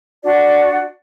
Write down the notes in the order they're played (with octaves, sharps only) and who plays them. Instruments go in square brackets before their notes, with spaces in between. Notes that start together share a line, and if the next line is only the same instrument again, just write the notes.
[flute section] D4 F#4 D5